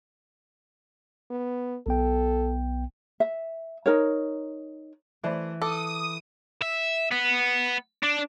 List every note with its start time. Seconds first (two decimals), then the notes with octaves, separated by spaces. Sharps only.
1.31 B3
1.87 B1 B3 A4 G5
3.20 E5
3.86 D#4 A#4 C#5
5.23 E3 A3 C5 D5
5.62 A4 D6 D#6
6.62 E5
7.11 B3
8.03 D4